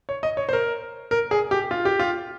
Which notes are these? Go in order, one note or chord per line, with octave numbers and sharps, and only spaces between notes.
C#5
D#5
C#5
C5
A#4
A#4
G#4
G4
F4
G4
F4